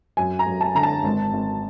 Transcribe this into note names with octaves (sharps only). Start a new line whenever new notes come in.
F#2 G#5
A#5
F#2
A5
D3 A#5
A5
G#1
G#1